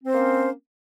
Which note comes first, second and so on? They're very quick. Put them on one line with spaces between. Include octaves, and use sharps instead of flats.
C4 C5 C#4 A#3